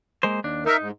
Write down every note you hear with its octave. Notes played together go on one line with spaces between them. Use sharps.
G#3 A#3 C5
D#2 D4
D#4 A#4 E5
G#2